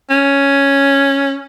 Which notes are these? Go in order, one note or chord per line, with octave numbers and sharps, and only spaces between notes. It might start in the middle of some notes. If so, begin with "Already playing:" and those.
C#4